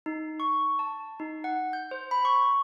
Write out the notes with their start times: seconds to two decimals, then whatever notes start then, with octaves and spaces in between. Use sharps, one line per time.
0.06 D#4
0.40 C#6
0.79 A5
1.20 D#4
1.44 F#5
1.73 G6
1.91 C5
2.11 B5
2.25 C#6